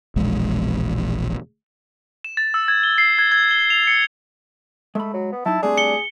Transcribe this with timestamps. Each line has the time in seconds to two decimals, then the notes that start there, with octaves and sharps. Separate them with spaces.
0.16 E1 A#1 E2 G#3
2.24 E7
2.37 A6
2.54 E6
2.68 G#6
2.83 G7
2.98 C7
3.19 G#6
3.32 G#6
3.51 G7
3.70 F7
3.87 C#7
4.95 G#3 A3 B5
5.14 F#3
5.32 B3
5.46 F#3 D#4 E4 A5
5.63 G3 A3 C4 D4 G#4
5.78 C#7 G7